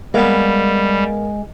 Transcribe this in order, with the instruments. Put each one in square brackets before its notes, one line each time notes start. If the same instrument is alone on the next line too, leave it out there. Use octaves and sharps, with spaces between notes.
[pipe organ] G3 [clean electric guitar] G#3 [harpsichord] A#3 B3